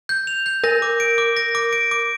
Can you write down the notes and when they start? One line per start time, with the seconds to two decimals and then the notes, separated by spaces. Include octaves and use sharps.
0.09 G6
0.27 F7
0.46 G6
0.64 A#4 A#6
0.82 D6
1.00 D7
1.18 D6
1.37 A#6
1.55 D6
1.73 D7
1.91 D6